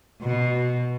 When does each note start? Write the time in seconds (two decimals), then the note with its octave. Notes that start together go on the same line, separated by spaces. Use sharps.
0.22 B2